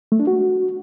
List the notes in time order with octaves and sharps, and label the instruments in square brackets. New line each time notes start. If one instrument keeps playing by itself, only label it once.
[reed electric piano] A3
D4
F#4